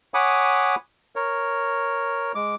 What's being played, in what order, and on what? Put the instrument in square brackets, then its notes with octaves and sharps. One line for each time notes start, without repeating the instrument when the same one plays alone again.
[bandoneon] C#5 F#5 G#5 B5 D6 D#6
A#4 C#5
G#3 D6